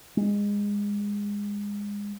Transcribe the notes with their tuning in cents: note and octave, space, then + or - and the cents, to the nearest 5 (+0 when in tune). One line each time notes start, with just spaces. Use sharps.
G#3 -25